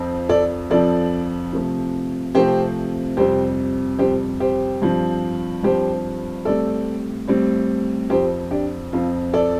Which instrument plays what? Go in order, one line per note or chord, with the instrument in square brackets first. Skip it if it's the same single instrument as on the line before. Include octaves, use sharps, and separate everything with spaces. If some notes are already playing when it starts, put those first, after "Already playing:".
Already playing: [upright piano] F2 F3 C4
A4 D5
F2 F3 C4 A4 D5
C3 F3 A3 C4
C3 F3 A3 C4 G4 C5
F2 C3 G3 C4 G4 C5
F2 C3 G3 C4 G4 C5
G4 C5
G2 F3 C4
G2 F3 C4 G4 C5
A2 G3 C4 A4 D5
A2 G3 C4
F2 F3 C4 G4 C5
D4 G4
F2 F3 C4 F4
A4 D5